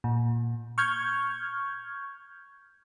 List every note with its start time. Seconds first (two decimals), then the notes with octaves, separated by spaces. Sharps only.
0.04 A#2
0.78 C#6 F6 G6 G#6